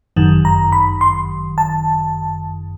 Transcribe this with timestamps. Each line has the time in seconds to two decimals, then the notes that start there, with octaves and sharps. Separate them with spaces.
0.16 G1 F#2 D#3
0.45 A#5
0.72 B5
1.01 C6
1.58 A5